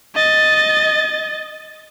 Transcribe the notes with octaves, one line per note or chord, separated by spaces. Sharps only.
D#5 A6